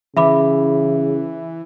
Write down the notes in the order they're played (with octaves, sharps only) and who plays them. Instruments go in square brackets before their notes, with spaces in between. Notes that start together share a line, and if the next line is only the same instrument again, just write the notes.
[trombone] C#3 [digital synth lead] E3 [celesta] E5 B5 D6